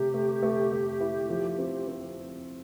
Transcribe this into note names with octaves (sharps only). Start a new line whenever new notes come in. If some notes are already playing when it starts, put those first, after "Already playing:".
Already playing: C3 A3 G4
A3
A3
A3
E4
F3
C4
C4